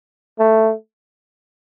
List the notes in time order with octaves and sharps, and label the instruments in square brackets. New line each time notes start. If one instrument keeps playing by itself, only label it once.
[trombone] A3